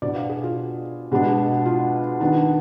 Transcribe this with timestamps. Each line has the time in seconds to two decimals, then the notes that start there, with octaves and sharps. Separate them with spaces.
0.02 B2 B3 D4 D5
0.16 F5
0.29 G#4
0.44 F4
1.12 B2 G#3 B3 D4
1.65 F4
2.20 D#3 B3 D4